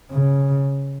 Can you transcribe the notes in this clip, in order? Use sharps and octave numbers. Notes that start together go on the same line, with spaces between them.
C#3